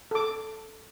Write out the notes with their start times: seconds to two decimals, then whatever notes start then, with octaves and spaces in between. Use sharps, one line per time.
0.11 A4 D6